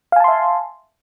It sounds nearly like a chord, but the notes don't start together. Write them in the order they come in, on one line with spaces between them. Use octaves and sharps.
F5 G#5 A5 C6 E5